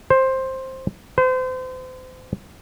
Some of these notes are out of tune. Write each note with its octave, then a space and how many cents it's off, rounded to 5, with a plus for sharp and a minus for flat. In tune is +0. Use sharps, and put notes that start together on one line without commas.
C5 +10
C5 -35